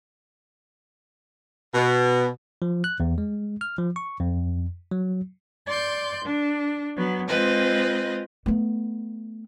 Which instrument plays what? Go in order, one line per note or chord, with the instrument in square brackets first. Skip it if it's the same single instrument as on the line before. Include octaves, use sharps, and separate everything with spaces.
[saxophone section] B2
[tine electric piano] F3
F#6
E2
G#3
F6
F3
C#6
F2
F#3
[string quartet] D5 C6 G6
D4
F#3 B3
G#3 C4 F4 B4 D#5
[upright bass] A3 B3